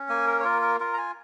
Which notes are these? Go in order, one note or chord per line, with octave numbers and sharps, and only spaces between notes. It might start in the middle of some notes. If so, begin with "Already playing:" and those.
Already playing: C#4
A#3 G#5
A#4
C#5
F4 A#4
A#4
F4 A#4
A#5
G#5